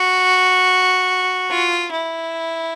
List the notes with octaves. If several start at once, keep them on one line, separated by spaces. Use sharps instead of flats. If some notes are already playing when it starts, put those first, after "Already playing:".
Already playing: F#4
F4
E4